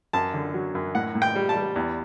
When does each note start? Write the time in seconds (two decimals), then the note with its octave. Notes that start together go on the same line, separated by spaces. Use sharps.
0.13 F#2 A5
0.34 D3
0.54 F#3
0.75 F#2
0.95 A2 F#5
1.15 A2
1.22 G5
1.35 G3
1.49 A5
1.56 G3
1.76 E2